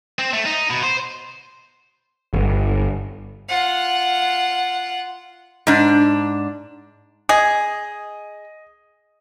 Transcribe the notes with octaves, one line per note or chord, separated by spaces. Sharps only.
C4
A3
D#4
B2
C5
G1
F4 F#5
G#2 D4
G#4 D#5